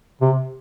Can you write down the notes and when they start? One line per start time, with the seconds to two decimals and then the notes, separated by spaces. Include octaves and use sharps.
0.21 C3